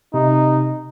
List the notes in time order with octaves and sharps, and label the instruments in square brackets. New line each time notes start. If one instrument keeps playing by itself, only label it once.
[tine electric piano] C3 [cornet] D#4